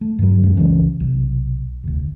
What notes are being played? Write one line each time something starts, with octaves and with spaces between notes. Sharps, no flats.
A3
G2 D3 F#3
F#2 F3 F#3 G#3
C2 C#3 E3 C#4
B1 C3
F1 D2